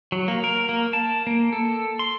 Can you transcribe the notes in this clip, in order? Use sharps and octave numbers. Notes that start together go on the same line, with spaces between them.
F#3
A#3
A#4
A#3
A5
A#3
A4
C6